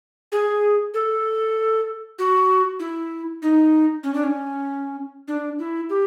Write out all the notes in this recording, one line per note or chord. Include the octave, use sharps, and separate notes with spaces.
G#4
A4
F#4
E4
D#4
C#4
D4
C#4
D4
E4
G4